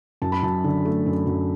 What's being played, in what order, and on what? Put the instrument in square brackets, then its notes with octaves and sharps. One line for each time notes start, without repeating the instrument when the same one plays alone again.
[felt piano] F#2 A5
B5
F#2 A5
D3
A3
F#2
F#2